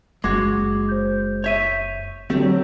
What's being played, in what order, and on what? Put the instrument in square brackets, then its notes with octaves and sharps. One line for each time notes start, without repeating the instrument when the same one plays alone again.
[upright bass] F#1 [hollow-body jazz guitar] G#3 F#4 [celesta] D6 G#6
[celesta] C5 G6
[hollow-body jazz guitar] C#5 E5 [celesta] G6 B6 D#7
[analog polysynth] D3 F#3 [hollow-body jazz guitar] A3 C4 G4